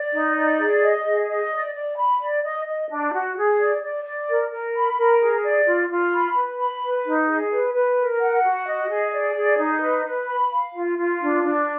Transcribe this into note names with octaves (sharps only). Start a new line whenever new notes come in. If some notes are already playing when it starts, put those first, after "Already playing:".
Already playing: D5
D#4
D5
G#4
D#5
G#4
D#5
D5
D5
B5
D5
D#5
D#5
D4
F#4
G#4
D5
D5
D5
A#4
A#4
B5
A#4
G#4
D5
F4
F4
B5
B4
B5
B4
D#4
G#4
B4
B4
A#4
F#5
F#4
D#5
G#4
D5
G#4
D#4
B4
B4
B5
F5
F4
F4
D4
D4